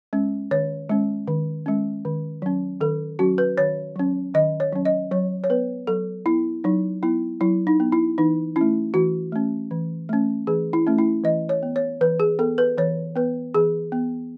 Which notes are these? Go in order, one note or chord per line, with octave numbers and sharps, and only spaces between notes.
G#3 C#4
D#3 C#5
G#3 C#4
D#3
G#3 C#4
D#3
F#3 C#4
D#3 A4
F#3 C#4 F#4
B4
D#3 C#5
F#3 C#4
D#3 D#5
C#5
F#3 C#4
D#5
F#3 C#5
C#5
B3 B4
F#3 A4
B3 E4
F#3 D#4
B3 E4
F#3 E4
D#4
B3
E4
E3 D#4
C#4 E4
A3
E3 F#4
A3 C#4
E3
A3 C#4
E3 G#4
E4
A3 C#4
E4
E3 D#5
C#5
B3
C#5
E3 B4
G#4
B3 A4
B4
E3 C#5
B3 B4
E3 G#4
B3